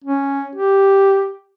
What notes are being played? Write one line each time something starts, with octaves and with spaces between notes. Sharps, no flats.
C#4
G4